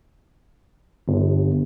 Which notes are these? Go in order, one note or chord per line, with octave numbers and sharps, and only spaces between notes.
G1